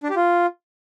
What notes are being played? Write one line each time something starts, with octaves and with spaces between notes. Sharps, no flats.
D4
G4
F4